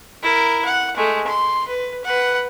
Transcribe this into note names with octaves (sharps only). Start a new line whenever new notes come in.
E4 A#4
F#5
G#3 A3
C6
B4
B4 F#5